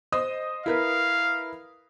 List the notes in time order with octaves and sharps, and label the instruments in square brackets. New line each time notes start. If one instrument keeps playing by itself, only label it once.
[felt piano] C5 D#5 D#6
[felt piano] E4 A#4 B4 [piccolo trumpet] F5